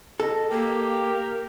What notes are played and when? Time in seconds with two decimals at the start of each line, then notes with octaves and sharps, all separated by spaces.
0.20 A4 D#5
0.50 A#3 G4 A#4